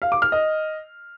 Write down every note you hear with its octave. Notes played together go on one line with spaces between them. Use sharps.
F5
D6
F6
D#5